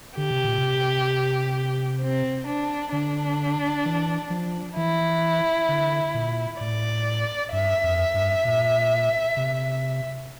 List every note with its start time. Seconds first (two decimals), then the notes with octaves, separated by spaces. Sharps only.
0.17 D3 G4
0.31 C3
0.45 A#2
0.58 C3
2.01 C4
2.47 D4
2.92 D3 D4
3.85 E3
4.30 F3
4.77 E3 E4
5.69 D3
6.14 A#2
6.60 A2 D5
7.53 G2 E5
7.84 F2
8.14 G2
8.45 A#2
9.37 C3